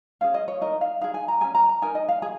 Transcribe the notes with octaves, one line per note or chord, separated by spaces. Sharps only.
C#4 G#4 F5
D#5
C#5
D#4 A#4 D#5
F5
D#4 G#4 F5
G#5
A#5
C#4 G#4 G#5
A#5
A#5
D#4 A#4 G#5
D#5
F5
G#4 G#5